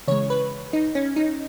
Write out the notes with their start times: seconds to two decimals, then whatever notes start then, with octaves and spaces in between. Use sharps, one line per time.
0.08 C#3 E3 G#3 C#5
0.30 B4
0.73 D#4
0.95 C#4
1.16 D#4